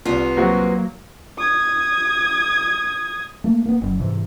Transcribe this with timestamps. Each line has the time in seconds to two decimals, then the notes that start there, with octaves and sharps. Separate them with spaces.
0.05 C2 B3 F4
0.37 F#3 A#3 C4 F#4
1.38 D#6 G#6
3.44 A3 A#3
3.66 A#3 B3
3.82 F#1 F#2 F#3
4.00 G#2 C3 E3